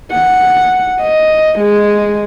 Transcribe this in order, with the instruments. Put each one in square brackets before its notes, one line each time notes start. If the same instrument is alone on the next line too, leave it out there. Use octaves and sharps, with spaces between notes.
[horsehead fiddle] F#5
D#5
G#3